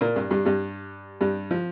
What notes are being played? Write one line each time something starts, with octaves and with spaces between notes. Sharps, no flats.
A#2 A#3
G2 G3
G2 G3
G2 G3
G2 G3
F3